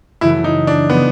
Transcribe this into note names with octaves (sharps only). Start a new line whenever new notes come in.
F#2 C#3 E3 A3 E4
D#4
D4
C#3 F3 B3